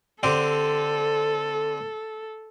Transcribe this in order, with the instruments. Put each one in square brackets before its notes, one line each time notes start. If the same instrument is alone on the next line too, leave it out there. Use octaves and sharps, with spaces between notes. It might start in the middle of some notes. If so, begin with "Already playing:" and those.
[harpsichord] D3 C4 G4 [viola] A4